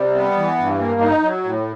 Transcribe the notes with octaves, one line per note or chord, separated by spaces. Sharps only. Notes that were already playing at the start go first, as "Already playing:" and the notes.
Already playing: C3 G3
B3
E3
G2
A#3
D#4
F#3
A2